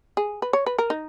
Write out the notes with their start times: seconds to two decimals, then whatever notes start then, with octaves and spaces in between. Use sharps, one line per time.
0.17 G#4
0.42 B4
0.53 C#5
0.66 B4
0.78 A#4
0.90 D#4